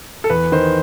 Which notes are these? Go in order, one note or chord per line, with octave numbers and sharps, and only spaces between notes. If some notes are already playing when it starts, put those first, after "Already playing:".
A4
E2 B4
D#3 C5